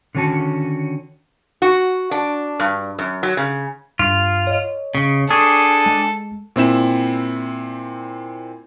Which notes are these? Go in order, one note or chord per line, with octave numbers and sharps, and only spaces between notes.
D3 D#3 C#4 F#4 A5
F#4
D4
G2
F#2
F#3
C#3
G2 F4
C#5 D#5
C#3
D4 G#4 A4 C#6
G#3
A#2 C4 E4 E7